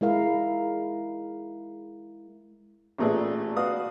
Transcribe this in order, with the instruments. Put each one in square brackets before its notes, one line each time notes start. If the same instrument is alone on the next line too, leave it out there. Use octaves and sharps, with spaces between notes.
[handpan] G#3 E4 A#4 F5
[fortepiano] A1 A#2 A3 G#4 B4 D5
F#4 B4 D5 F5 D#6